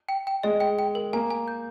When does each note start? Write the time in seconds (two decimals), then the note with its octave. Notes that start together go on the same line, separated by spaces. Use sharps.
0.09 G5
0.27 G5
0.43 G#3 D#5
0.60 G5
0.79 G5
0.95 A#4
1.13 A#3 G#5
1.30 G#5
1.48 G6